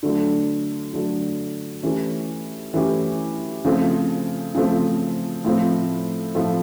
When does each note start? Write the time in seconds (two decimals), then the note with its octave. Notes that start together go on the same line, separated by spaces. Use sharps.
0.03 D3 F#3 A3
0.93 D3 F#3 A3
1.83 E3 A3 C#4 E4 G4
2.74 E3 A3 C#4 E4 G4
3.65 C#3 F3 A3 C4
4.54 C#3 F3 A3 C4
5.45 A2 F3 A3 C4
6.35 A2 F3 A3 C4